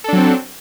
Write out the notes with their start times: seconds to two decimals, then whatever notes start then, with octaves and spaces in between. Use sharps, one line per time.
0.04 A4
0.08 D4
0.13 F#3
0.17 C4